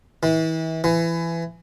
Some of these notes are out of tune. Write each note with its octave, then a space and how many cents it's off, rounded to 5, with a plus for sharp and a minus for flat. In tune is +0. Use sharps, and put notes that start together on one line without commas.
E3 -35
E3 +20